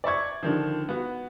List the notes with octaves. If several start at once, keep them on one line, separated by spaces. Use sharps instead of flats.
D5 E5 C#6 G#6
D3 D#3 F3
B3 F#4